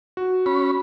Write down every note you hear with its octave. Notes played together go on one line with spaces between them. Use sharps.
F#4
C#4 B5